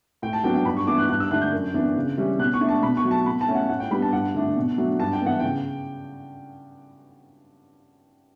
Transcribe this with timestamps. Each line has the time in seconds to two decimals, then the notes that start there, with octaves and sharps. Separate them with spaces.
0.22 A2 G5
0.33 A5
0.44 F#3 B3 D4 G5
0.54 G5
0.65 G2 B5
0.77 C#6
0.87 E3 B3 D4 D6
0.98 F#6
1.09 G2 F#6
1.20 E6
1.31 D3 A3 D4 F#6
1.41 G6
1.53 F#2
1.74 E3 B3 D4
1.96 C#3
2.17 E3 G3 C#4
2.39 B2 F#6
2.54 C#6
2.61 A3 D4
2.69 A5
2.83 B2 B5
2.97 C#6
3.04 F#3 A3
3.11 A5
3.26 B2 B5
3.41 A5
3.48 A3 C#4
3.55 F#5
3.69 A2 F#5
3.80 G5
3.91 G3 B3 D4 B5
4.02 A5
4.13 G2 F#5
4.34 D3 A3 D4
4.56 B2
4.78 F#3 A3 D4
4.99 G2 A5
5.13 G5
5.22 E3 B3 F#5
5.39 C#3 G5